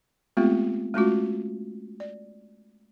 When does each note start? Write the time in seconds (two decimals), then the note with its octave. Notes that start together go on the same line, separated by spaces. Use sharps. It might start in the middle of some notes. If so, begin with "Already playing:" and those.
0.37 G#3 A3 B3 C4 F4 G4
0.94 G#3 A3 C#4 F4 F#4
2.00 D5